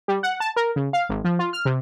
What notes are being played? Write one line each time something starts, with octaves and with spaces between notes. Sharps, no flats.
G3
F#5
A5
A#4
C#3
F5
G#1
F3
F4
F6
C3